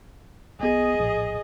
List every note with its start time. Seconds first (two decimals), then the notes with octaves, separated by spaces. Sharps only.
0.60 B1 B3 G#4 D#5
1.00 A#1 A2